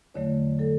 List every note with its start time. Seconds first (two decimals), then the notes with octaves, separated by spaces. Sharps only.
0.14 E2 D3 F#3 A3 C#5
0.59 D3 F#3 A4